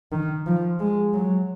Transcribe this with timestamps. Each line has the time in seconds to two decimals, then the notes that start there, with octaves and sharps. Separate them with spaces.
0.12 D#3
0.46 F3
0.80 G#3
1.14 F#3